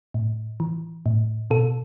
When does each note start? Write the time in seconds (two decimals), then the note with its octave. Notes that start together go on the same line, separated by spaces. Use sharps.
0.14 A2
0.60 E3
1.06 A2
1.50 B2 A4